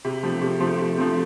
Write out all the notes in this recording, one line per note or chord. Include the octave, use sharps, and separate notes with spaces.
C3
F3 A3 C4 G4
C3
F3 A3 C4 G4
C3
F3 A3 C4 G4